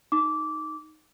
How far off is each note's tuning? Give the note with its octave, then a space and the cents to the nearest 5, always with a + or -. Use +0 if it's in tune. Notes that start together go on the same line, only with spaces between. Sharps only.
D#4 +0 D6 -15